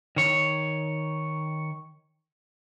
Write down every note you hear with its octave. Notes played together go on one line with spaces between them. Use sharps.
D#3 C#5